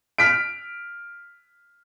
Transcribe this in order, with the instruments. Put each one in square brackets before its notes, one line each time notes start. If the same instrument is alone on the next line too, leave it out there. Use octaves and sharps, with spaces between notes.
[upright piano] F6 B6 D7